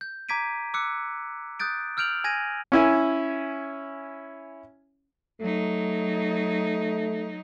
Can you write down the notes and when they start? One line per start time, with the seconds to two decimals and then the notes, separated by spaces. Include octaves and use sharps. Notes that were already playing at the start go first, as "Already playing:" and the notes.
0.01 G6
0.29 A#5 D6 G#6 B6 D7 D#7
0.74 D6 E6 F#6 C#7
1.59 D#6 F#6 G6 A6 D7
1.97 E6 F6 G6 D7 F7 F#7
2.24 G#5 G#6 A#6 D#7
2.72 C#4 E4 G#5
5.41 F#3 A3 D#4